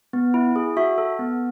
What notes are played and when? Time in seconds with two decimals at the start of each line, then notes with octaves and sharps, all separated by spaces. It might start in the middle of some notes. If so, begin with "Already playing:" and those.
0.13 B3
0.34 E4
0.56 G#4
0.77 F#4 E5
0.98 A4
1.19 B3